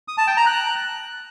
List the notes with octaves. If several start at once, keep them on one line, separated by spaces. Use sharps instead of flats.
D#6
A5
G5
A#5
F#6